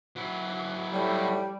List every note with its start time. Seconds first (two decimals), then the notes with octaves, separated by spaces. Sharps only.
0.16 F#3 E4
0.93 A2 G3